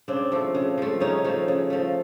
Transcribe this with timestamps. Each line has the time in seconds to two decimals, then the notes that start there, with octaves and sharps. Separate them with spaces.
0.08 C#3 C4 D4
0.32 F3 A3
0.54 C#3
0.78 F3 A3
1.01 C#3 C#4 D#4
1.24 F3 A3
1.48 C#3
1.70 F3 A3